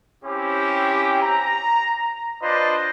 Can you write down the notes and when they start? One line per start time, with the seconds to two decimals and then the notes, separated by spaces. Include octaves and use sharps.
0.24 C4 C#4 E4 G4
1.22 A#5
2.42 D4 F4 B4 C5 D5 D#5